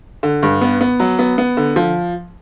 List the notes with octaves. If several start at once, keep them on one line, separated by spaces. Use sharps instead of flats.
D3
G2
B3
B3
F#3
B3
B3
D3
F3